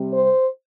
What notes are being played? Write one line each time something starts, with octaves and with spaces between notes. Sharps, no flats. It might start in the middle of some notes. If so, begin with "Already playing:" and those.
Already playing: C3 G3 C4
C5